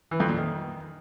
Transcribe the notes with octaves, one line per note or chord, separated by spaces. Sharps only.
E3
F2
A#2
D#3